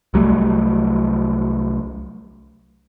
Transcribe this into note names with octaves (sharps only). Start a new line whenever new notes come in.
C2 F#3 G3 A3